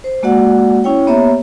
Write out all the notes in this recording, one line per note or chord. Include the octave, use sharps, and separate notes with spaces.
C5
G#3 A#3 F#4 D5 F#5
C#4 E4 C#5 G5
A#3 B3 G4 C#5 E5 A#5